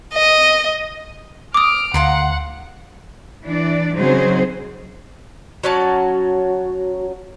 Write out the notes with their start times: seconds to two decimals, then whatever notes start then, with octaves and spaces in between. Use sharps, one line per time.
0.13 D#5
1.54 D6 D#6 F6 D7
1.94 D2 F5 F#5 A#5 C6
3.45 E3 D4 D5
3.97 C#3 F#3 C4 D#4 G#4 C5
5.63 F#3 C#4 F#4 A5